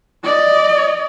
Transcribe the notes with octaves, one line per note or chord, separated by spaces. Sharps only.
D5 D#5